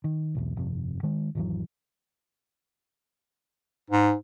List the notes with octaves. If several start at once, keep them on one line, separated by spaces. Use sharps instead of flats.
D#3
E1 B1 E2
G1 F2 C3
D#3 G#3
G#1 E2 E3 F#3
G#2